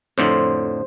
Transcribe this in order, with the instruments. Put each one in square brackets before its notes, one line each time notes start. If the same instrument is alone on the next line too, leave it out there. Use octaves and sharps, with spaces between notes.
[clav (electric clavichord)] F2 A2 D3 [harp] C5